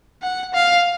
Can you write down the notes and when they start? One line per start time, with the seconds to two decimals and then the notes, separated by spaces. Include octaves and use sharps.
0.23 F#5
0.54 F5